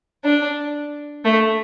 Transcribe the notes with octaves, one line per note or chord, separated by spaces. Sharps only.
D4
A3